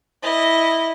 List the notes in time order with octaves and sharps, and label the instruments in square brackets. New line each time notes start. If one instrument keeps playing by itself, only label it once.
[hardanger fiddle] E4 D#5